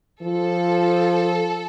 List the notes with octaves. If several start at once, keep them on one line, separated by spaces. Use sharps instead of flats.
F3 A4